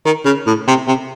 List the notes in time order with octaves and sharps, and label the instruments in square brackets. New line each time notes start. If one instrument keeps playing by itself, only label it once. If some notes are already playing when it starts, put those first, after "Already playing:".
[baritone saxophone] D#3
C#3
A2
C3
C3